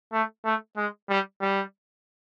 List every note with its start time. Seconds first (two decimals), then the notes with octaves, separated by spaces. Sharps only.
0.13 A3
0.45 A3
0.77 G#3
1.10 G3
1.42 G3